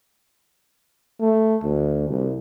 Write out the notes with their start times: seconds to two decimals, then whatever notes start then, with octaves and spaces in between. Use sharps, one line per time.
1.20 A3
1.64 D2
2.09 C2